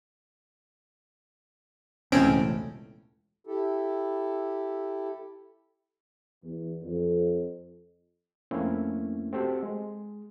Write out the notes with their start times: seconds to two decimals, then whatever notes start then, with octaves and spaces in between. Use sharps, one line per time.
2.12 E1 C#2 A2 C4 C#4 D7
3.47 E4 G4 A4
6.43 E2
6.82 F2
8.51 F2 A3 A#3 C4 C#4 E4
9.33 C4 F#4 G4 A4 C5
9.63 G#3